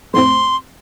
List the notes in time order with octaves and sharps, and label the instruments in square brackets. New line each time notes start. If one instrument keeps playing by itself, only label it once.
[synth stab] F2 A2 C4 [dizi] C6